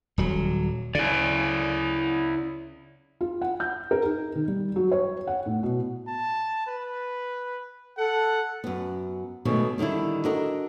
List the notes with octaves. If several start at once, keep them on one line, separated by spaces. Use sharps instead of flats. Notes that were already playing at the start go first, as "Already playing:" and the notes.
D#1 F#3
C#3 E4 D5
F4
F#5
G6
A#4
D#4
D#3
G3
F#3
C#5
F#5
A2
B2
A5
B4
A4 F#5
F#2 B3
B2 D#3 F#3 G#3 A3
D3 D#3 G3 D4 E4
D4 F#4 A4 A#4 D#5